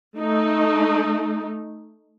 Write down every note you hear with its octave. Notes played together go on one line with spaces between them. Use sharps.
A3 D#4